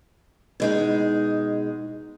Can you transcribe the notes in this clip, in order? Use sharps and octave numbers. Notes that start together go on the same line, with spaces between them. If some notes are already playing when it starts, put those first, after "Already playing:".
B2 G#3 D#4